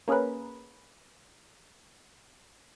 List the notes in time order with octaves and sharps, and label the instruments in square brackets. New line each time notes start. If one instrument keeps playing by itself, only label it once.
[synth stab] A#3 C#4 G#4 A#4 B4